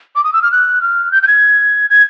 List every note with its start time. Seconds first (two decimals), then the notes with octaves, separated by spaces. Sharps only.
0.16 D6
0.24 D#6
0.33 E6
0.43 F6
0.52 F#6
0.82 F6
1.12 G6
1.23 G6
1.27 G#6
1.90 G#6